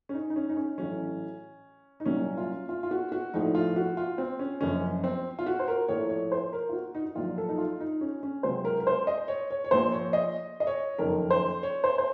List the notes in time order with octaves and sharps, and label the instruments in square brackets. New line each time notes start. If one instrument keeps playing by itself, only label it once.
[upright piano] C#4
D#4
D#4
C#4
D#4
C#4
A1 A2 F#3 C#4
D#4
C2 A#2 F#3 C#4
F4
F4
F4
F#4
F#4
A#1 A2 F3 D#4
F4
F#4
F4
C4
C#4
F#1 F#2 F3 C#4
C4
F4
F#4
C5
A#4
A#1 A2 F3 C#5
C#5
C5
A#4
F4
F#4
D#4
D#4
A#1 A#2 F#3 F4
A4
D#4
F4
D#4
C#4
C#4
C#2 C3 F#3 C5
A#4
A#4
C5
D#5
C#5
C#5
C#5
A#1 A#2 F3 C5
C#5
D#5
D#5
C#5
F#1 F2 D#3 A#4
C5
C#5
C5
C5